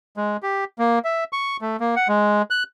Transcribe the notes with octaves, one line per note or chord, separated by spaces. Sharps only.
G#3
G4
A#3
E5
C#6
A3
A#3
F#5
G#3
F#6